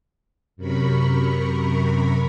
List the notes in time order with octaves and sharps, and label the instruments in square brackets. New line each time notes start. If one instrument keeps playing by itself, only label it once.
[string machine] F#2 C3 A#4 B5 C#6